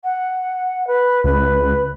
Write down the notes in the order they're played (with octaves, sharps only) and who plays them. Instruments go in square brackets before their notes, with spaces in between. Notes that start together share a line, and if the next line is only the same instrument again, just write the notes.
[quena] F#5
B4
[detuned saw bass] C#2 [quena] B4